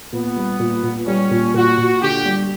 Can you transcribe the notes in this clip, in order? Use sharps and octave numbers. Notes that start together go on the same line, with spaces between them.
A#2 B3
G3
A#2
A#2
G3 C#4
A#2
A#2 F#4
A#2
D3 G4
G3